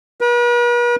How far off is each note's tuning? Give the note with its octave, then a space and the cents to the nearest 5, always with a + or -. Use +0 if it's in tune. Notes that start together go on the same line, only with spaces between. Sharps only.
B4 -45